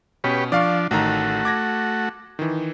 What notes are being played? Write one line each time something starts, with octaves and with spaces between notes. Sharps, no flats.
B2 C#4 G4 B4 C#5
F3 D4 D5 F5 C#6
A1 D#3 A3 F#4 A#5
D6 G#6 A#6
D#3 E3